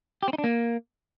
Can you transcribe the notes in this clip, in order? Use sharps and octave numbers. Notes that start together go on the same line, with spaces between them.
G4
C4
D#4
D4
A#3